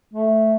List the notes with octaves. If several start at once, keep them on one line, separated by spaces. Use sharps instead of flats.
A3